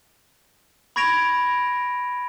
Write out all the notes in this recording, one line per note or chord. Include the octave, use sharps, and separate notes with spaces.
B5 C#6 G#6 A#6 D7 F7